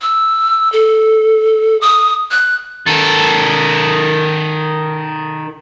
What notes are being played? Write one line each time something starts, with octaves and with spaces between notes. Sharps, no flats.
E6
A4
D#6
F#6
D#3 A4